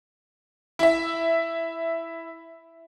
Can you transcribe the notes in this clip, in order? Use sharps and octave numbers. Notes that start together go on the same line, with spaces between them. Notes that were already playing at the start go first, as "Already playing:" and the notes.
E4 E5